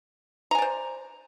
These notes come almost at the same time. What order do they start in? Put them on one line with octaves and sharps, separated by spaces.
A#5 G#5 D5 C5